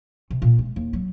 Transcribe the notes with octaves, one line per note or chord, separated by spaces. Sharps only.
C3
A#2
G#3
D#2
F#3